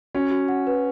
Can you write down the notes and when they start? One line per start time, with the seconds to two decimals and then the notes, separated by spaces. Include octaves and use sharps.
0.15 C#4 F#4
0.31 F#4
0.48 F#5
0.67 B4